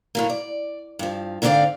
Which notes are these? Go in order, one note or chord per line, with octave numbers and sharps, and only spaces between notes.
A2 F#3 A#3
D5
G2 F3
G#2 D3 C4 D4 D5 F5